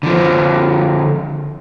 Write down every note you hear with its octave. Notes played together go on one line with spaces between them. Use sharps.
D3 F3